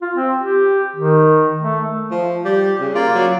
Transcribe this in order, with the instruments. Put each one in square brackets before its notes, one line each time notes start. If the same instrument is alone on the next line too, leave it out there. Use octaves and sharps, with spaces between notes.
[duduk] F4
C4
G4
D#3
A3
[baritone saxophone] F3
[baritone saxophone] G3 [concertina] G4
[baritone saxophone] C#3
[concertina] A#3 F4 D5
[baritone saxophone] F#3